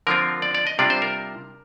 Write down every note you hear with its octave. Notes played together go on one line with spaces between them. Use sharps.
D3 F3 C4 F4 A#4
D5
D5
D#5
C3 G3 D4 F4 D5
C5
A#4